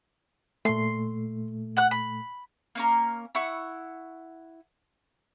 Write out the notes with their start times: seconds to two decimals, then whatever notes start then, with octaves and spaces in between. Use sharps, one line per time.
0.65 A#2 A3 C6
1.77 F#5 F#6
1.91 B5
2.75 A#3 C#4 A#4
3.35 E4 F#5 C#6